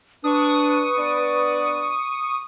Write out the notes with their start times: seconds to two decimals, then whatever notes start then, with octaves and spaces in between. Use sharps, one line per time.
0.24 D4 B4 C#6 D#6
0.98 B3 D4 D5